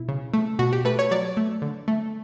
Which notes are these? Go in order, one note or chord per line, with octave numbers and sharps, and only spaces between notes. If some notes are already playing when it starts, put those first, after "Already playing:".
Already playing: B2 E4
C#3
A3
B2 F#4
G4
A3 B4
C#5
F#3 D5
A3
D3
A3